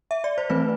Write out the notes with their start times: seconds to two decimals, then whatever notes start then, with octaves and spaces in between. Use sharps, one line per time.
0.11 E5
0.24 D5
0.38 C5
0.50 E3 A3 C4 B4